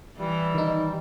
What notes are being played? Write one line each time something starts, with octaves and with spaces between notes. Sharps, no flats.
E3 G3
D#3 D#4